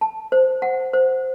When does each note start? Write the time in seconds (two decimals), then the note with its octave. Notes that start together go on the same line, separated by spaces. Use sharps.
0.01 A5
0.32 C5
0.62 F#5
0.93 C5